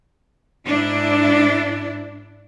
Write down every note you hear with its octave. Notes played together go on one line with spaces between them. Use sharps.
G#2 D4 E4